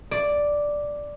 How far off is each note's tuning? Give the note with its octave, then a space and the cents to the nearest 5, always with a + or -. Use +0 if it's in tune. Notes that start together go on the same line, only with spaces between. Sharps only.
D5 +0